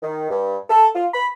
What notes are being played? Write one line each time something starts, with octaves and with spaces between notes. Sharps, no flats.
D#3
G2
A4
F4
B5